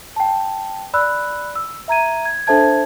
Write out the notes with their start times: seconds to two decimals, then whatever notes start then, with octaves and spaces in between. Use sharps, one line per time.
0.16 G5 A5
0.94 D5 B5 E6 F#6
1.56 E6
1.88 E5 A#5 G#6 D#7
2.25 G#6
2.47 D4 A4 C5 E5 A5 G#6